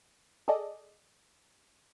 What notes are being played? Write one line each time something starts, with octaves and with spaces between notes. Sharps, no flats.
G#4 A4 D5 D#5